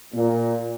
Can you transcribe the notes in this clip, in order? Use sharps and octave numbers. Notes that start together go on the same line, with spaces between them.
A#2